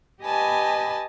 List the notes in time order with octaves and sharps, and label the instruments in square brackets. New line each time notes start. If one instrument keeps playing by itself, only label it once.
[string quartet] G4 B4 D#5 G#5 A5 B5